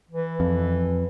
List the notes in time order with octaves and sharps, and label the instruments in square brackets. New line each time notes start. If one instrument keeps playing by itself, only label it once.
[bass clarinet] E3
[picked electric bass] F2